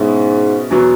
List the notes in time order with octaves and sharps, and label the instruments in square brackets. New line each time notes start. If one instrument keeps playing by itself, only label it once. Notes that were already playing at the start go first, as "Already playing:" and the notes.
Already playing: [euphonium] G#2 [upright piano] B2 G#3 C#4 E4
[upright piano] E2 B2 F#3 B3